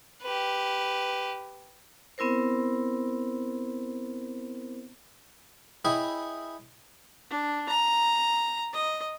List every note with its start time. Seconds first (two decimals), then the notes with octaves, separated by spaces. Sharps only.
0.22 G4 B4
2.18 B3 C4 E4 A#4 C5
5.85 E4 G#4 C#5 D#5 G5 B5
7.31 D4
7.69 A#5
8.73 D#5